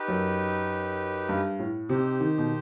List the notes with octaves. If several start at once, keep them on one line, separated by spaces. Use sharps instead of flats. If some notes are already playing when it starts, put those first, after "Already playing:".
Already playing: D#4 G4 B4
F#2
G2
A2
C3 D#4 G4 C5
D#3
B2